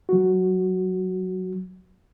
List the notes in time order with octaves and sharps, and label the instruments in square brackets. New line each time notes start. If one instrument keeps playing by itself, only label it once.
[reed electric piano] F#3 F#4